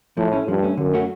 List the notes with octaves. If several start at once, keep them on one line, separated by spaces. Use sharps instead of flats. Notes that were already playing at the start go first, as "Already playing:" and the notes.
A2 F3
A3 C#4
G2 F3
A3 C#4
F#2 D3
F#3 A3 C#4 F#4